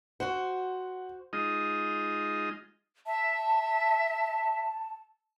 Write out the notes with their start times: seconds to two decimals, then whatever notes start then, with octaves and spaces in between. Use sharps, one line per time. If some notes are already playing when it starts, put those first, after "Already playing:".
0.20 F#4 C5 F#5
1.33 G#3 D#4 F4 D#5
3.06 E5 A5